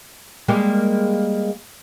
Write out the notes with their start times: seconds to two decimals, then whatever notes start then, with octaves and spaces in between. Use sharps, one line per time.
0.48 G3 G#3 A#3